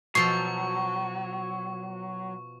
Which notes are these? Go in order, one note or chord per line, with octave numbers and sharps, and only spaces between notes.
B2 F3 F#3 A4 C#6 C7